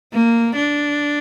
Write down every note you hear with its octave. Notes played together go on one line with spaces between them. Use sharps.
A#3
D4